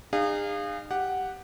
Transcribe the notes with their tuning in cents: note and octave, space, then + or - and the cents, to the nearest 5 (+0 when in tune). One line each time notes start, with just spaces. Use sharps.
D#4 -40 G#4 -35 F5 +0
G4 +0 F#5 +0